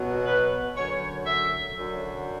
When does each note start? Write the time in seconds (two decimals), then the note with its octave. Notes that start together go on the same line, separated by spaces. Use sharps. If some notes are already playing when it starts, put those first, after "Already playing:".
Already playing: B2 F#3
0.26 B4
0.76 F#2 D3 F#3 C#5
1.26 E5
1.76 F#2 D3 F#3